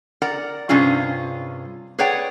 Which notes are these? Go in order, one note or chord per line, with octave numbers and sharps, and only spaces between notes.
A#4 D5 F#5
G2 C3 C#4 F4 G#4
G#4 B4 C#5 D5 F#5 G5